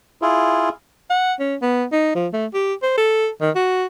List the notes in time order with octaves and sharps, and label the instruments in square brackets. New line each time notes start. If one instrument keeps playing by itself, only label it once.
[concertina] E4 F4 G#4
[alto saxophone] F#5
C#4
B3
D#4
F3
A3
G4
C5
A4
D#3
F#4